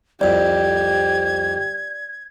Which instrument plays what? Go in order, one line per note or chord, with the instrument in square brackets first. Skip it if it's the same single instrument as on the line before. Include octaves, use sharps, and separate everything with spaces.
[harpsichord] C2 F2 [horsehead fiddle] G4 [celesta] D5 [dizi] G#6